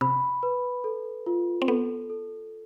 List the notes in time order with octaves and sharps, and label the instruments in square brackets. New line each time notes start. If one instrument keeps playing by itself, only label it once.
[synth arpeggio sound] C3 [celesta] B5
[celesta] B4
A4
F4
[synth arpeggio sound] C4
[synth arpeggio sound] B3 [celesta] A4
[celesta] A4